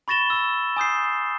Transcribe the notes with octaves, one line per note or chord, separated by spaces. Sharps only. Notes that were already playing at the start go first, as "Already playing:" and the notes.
B5 C#6 A6 A#6 E7 G7
C#6 E6
G#5 D#6 G6 C7